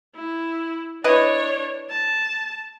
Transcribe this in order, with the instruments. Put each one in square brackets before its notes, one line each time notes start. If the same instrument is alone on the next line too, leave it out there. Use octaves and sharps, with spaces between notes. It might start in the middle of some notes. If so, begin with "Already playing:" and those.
[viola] E4
[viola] D4 C#5 [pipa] E4 B4 D#5
[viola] A5